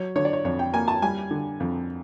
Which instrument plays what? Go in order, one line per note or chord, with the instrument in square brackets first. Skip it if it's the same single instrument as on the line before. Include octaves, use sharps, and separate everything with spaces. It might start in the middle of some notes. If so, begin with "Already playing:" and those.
Already playing: [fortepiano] F#3 C#5
D3 C#5
D5
C#5
F2 C#5
G5
A#3 G#5
A5
G3 G#5
D3
F2